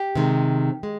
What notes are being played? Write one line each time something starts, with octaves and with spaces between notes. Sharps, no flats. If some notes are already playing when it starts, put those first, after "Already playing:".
Already playing: G4
C3 D#3 G#3
G#3